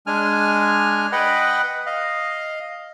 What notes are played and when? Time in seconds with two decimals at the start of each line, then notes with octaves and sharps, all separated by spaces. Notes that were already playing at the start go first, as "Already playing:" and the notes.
0.07 G#3 D4 G#5 F6
1.12 B4 D#5 F#5 G5 B5
1.86 D#5 F5